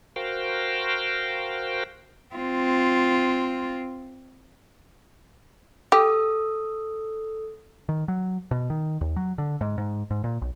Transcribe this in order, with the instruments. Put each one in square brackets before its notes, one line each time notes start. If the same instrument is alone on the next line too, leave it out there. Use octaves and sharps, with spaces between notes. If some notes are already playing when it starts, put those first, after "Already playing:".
[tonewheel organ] F#4 A#4 C5 F5 G5
[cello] C4 F4
[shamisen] G4 [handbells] A4 D#6
[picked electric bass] D#3
F#3
B2
D#3
D#2
F#3
D3
G#2
G#2
G#2
A#2
B1